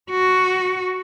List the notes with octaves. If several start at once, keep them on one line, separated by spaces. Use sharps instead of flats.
F#4